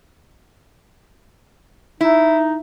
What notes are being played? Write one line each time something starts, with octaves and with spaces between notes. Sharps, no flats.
D#4 E4